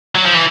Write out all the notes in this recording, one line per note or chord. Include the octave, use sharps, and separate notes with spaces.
F#3
F3
E3